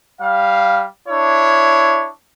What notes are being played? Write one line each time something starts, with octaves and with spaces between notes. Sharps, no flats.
G3 F5
D4 E4 C#5